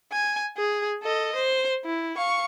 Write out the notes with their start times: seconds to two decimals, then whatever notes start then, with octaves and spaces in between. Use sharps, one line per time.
0.12 G#5
0.57 G#4
1.02 A4 D#5
1.35 C5
1.85 E4
2.16 F5 C#6